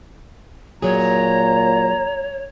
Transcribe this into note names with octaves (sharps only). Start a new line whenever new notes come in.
A#2 F#3 G#4 C#5 A#5